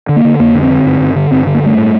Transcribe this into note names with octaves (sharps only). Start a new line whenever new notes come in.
D3
A#3
D3
F2 A#3
D3
C4
D3
G2
G2
D3
G2 C4
D3
A#3
G2 A3
A2